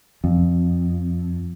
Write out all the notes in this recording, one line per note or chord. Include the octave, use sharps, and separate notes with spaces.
F2